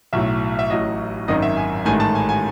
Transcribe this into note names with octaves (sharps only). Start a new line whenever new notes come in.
B1 A2 F#3 E5
E5
A1 A2 F#3 D#5
G#1 F#2 D#3 D#5
E5
G#5
A1 G#2 D#3 A3 G#5
A5
G#5
G#5